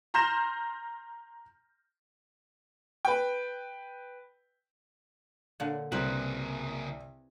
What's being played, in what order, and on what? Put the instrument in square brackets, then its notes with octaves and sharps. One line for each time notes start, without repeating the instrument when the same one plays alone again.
[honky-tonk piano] A#5 C6 F6 G6 A#6 E7
[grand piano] B4 G5
[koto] A#2 D3
[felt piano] C2 [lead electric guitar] C#3 A#3 [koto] C4 B4